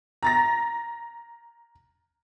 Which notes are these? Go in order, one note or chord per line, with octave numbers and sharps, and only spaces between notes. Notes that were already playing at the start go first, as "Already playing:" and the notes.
A#5 A6 A#6